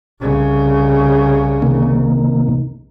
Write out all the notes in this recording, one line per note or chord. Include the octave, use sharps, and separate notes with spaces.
C2 C#3
C3 D#3 A#3